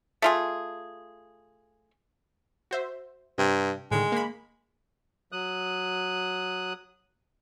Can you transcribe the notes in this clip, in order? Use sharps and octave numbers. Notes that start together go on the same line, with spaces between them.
A3 F4 G#4
F#4 C5 E5
G2 C3
A2 D3 D#3 G#3
A#3 B5
F#3 D#6 F#6